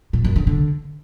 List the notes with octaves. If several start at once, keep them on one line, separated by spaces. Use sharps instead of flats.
A#2
F#2
D3
D3